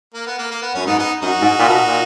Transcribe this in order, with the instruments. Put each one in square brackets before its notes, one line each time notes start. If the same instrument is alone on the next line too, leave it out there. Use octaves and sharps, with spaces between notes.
[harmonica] A#3
B3
A#3
A#3
B3
[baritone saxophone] F#2 [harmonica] C#4
[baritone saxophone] G#2 [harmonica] B3 D#4
[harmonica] B3 D#4
[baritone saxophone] F#2 [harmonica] D#4 F#4
[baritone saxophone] G#2
A#2
B2
A#2